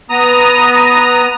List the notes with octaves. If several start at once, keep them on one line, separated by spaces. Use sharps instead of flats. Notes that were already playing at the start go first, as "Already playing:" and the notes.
B3 A#5 D#6